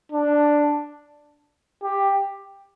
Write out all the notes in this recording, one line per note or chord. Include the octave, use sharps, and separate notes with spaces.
D4
G4